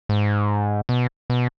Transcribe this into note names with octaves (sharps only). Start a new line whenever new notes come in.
G#2
B2
B2